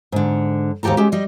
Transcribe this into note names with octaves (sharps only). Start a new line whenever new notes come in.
G#2 D3
D#2 G#2 B2 G4 A4 A#5
G#3 C#4 G4
G3 D#5